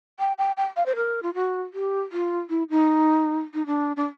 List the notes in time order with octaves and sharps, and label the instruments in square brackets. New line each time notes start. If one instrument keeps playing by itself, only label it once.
[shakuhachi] G5
G5
G5
F5
C5
A#4
F4
F#4
G4
F4
E4
D#4
D#4
D4
D4